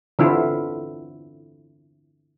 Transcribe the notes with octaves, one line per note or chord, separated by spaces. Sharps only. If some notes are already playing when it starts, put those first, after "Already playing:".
D3 E3 C4 E4 F4 A4